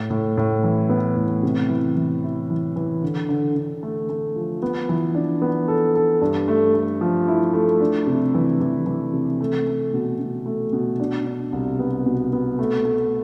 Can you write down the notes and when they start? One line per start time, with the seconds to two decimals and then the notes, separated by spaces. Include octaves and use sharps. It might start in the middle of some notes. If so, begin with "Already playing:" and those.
Already playing: A2
0.10 A2
0.37 A2
0.64 E3
0.89 B3
1.16 A2
1.43 C3
1.69 E3
1.96 E3
2.23 E4
2.50 E3
2.76 E3
3.02 D3
3.29 D3
3.56 D3
3.83 A3
4.09 A3
4.36 F3
4.62 B3
4.89 E3
5.15 D4
5.42 B3
5.68 A4
5.95 A4
6.22 G2
6.48 A3
6.74 A3
7.01 F3
7.28 E4
7.54 A3
7.81 D4
8.07 C3
8.34 E3
8.61 E3
8.86 E3
9.13 C3
9.41 A3
9.67 A3
9.94 B2
10.20 B2
10.46 A3
10.73 B2
11.00 D4
11.26 D4
11.52 C2
11.79 B3
12.06 B2
12.33 B3
12.59 A3
12.85 A3